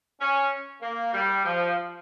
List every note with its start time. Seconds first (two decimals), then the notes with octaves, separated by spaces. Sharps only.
0.21 C#4
0.82 A#3
1.13 G3
1.45 F3